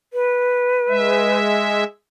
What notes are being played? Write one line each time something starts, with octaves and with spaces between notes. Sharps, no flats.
B4
G#3 E5